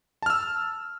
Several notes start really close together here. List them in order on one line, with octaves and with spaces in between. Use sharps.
A5 F6 E6